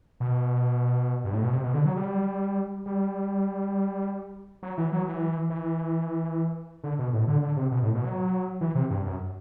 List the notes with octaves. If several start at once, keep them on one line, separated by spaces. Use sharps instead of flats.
B2
G2
A2
B2
C3
B2
D3
F#3
G3
G3
F#3
E3
F#3
E3
E3
D3
B2
A2
D3
D3
C3
B2
A2
B2
F#3
E3
C3
G2
F#2